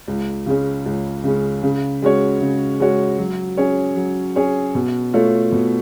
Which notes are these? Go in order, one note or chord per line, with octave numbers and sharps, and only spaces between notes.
C#2
C#3 G#3 C#4
C#2
C#3 G#3 C#4
C#3
G#3 C#4 F#4 C#5
C#3
G#3 C#4 F#4 C#5
F#3
C#4 G#4 C#5
F#3
C#4 G#4 C#5
B2
A3 F4 A4 C#5
B2